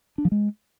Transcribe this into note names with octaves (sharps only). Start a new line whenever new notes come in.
D4
F3
G#3